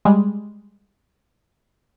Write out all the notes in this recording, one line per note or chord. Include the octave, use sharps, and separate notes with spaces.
G3 G#3